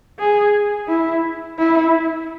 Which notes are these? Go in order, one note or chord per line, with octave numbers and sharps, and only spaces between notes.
G#4
E4
E4